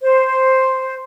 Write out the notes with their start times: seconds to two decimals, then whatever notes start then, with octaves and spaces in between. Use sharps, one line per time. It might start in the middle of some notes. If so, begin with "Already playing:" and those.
0.03 C5